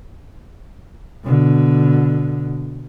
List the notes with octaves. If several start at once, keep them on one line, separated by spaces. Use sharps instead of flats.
B2 D3